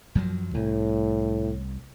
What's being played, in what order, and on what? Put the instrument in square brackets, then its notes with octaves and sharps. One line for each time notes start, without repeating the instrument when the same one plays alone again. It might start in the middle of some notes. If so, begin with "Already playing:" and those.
[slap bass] F#2 F3 F#3
[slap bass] C2 [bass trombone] A2